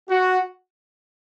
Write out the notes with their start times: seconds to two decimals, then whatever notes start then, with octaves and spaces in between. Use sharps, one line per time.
0.10 F#4